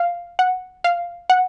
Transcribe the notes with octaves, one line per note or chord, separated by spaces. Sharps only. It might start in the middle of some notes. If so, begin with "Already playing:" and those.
Already playing: F5
F#5
F5
F#5